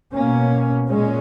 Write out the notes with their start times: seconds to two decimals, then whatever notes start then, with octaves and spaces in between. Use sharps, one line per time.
0.13 B2 A#3 C#4
0.87 A#2 G#3 C#4